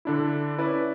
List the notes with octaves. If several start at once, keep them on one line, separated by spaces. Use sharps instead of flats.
D3 D4 E4
C#4 E4 B4 D5